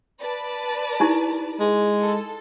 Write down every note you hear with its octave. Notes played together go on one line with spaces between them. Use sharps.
B4 D5 A5
D#4 E4 G4
G#3
A4